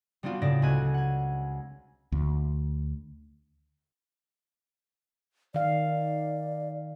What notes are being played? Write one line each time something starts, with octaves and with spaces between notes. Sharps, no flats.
G3 B3 C4 D4 F4 F#4
A2 C#3 D4 D5 A#6
C#2 C4 F#4 G#5 F#6
F#5 G#5
D2
D#3 D5 F5